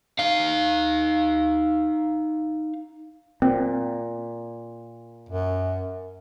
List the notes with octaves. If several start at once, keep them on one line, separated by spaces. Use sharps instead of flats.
D#4 F5
A#2 C4
F#2